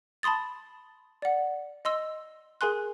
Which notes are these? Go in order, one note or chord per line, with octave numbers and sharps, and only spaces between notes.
A5 B5 C6 D#6 A6
D5 F#5
D#5 C6 E6
G#4 A#4 G#5 C6 F#6